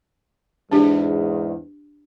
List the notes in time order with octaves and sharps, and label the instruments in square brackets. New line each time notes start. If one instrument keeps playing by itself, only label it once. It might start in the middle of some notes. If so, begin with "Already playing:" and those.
[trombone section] E2 G#2 [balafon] D4 G4